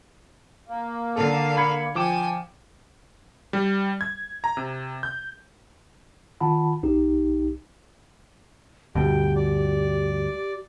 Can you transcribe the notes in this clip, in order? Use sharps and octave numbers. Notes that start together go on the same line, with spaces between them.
A#3
D3 A4 F5
B5 G#6 C#7
F3 G5 G#5 D6 E7
G3
G#6
A#5
C3
G6
D#3 F4 F#5 A5 B5
B1 D#4 G4
D2 G2 B2 G4 G5
D5